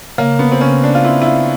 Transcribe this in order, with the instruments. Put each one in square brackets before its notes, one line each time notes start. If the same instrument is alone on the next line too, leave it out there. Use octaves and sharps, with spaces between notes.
[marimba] C#3 [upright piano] A#3
[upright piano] B3
C4
[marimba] C#3 [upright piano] C#4
[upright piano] D4
F4
[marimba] C4 [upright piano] E4
[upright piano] E4
F4